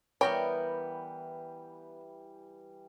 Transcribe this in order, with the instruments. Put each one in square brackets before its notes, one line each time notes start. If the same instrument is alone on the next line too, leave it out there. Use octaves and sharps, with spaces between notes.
[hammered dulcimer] E3 G3 [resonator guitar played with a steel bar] B3 A#4 G5 [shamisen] C#5